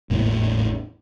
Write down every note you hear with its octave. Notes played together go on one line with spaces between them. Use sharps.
G#1 E2 A2 A#3